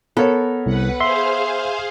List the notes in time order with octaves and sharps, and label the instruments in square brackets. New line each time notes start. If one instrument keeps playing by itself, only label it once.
[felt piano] B3 A#4 C#5 [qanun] A4
[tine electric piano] C2 [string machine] B4 F#5
[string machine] G#4 C5 F5 [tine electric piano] E5 C6